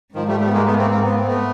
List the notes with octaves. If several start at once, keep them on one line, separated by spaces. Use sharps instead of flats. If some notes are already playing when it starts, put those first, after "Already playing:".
G#2 D#3 F3
G3 A3
G3 A3
B3
G#3 A#3
A3 B3
A#3 C4
A#3 C4
B3
C4
A3 B3